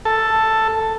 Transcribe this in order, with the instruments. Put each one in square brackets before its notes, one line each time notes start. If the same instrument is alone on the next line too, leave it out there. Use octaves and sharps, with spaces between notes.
[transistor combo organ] A4